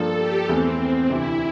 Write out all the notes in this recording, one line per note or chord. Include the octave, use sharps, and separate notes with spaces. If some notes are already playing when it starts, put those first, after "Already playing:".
Already playing: G2 F3 A#3 D4 F4 A4
G4
E2 E3 A3 C4
D2 C3 E3 E4